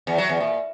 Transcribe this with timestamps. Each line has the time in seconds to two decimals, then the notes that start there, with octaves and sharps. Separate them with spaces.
0.07 E2
0.18 F#3
0.29 E2
0.40 A#2